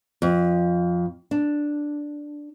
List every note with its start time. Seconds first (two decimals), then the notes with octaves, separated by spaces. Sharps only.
0.22 F2
1.31 D4